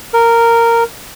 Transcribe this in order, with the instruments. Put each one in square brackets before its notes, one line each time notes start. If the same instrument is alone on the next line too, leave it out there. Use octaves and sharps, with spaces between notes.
[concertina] A#4